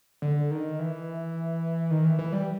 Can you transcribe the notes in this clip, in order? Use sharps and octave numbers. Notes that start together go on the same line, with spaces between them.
D3
D#3
E3
D#3
E3
E3
G3